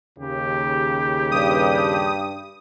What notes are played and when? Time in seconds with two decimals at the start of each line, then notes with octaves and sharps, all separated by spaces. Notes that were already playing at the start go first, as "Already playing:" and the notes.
0.18 D#2 C#3 G4
1.32 G2 D#6